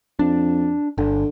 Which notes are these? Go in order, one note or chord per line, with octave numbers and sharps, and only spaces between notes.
F2 D4
G1 D3